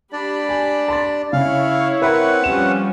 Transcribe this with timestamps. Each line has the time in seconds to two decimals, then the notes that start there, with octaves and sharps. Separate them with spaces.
0.13 D4 G4 D5 B5
0.49 G#5
0.88 A5 C6 A6
1.33 C#3 E4 C#5 F5
2.02 C4 A#4 B4 E5 F#5 B5
2.44 F3 G3 C#4 E7